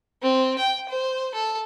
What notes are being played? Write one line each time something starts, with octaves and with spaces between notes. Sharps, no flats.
C4
G5
C5
A4